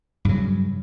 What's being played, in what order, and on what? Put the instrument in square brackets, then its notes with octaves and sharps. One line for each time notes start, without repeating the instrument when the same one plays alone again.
[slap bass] G2 C#3 F#3